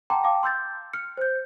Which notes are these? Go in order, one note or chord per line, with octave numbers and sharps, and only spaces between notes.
F#5 G5 A5 A#5 C6 D6
F5 G5 A5 D6
C6 E6 G6 A6
F6 C#7
C5 G6